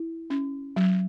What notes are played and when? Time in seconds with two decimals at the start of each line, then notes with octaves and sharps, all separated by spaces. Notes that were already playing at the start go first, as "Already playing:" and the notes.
Already playing: E4
0.30 C#4
0.76 F#3